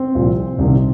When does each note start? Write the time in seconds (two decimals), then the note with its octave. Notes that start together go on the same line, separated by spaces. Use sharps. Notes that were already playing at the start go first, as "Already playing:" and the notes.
Already playing: C4
0.15 C2 A#2 F3
0.59 C2 C3 D#3